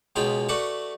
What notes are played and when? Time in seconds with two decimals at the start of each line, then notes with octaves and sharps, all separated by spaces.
0.16 C#2 B2 F4 G#4 G5 B5
0.49 A3 F#4 A4 B4 D5 F#5